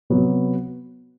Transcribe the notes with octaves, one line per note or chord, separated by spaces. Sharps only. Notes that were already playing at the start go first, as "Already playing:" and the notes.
C3 F#3 B3